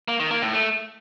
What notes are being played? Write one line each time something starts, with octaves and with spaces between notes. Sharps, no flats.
A#3
D#3
A#3
A2
A3